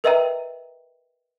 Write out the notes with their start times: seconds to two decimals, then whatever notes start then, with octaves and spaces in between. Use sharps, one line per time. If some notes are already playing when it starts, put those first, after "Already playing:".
0.04 A#4 B4 D#5 E5 G5 A#5